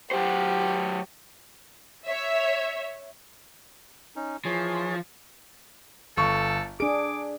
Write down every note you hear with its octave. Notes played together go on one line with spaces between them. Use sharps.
F#3 G4 C5
C#5 E5
C#4 D#4
E3 F3 G#4 C#5
G1 A4 C#6
D4 G#4 D6 D7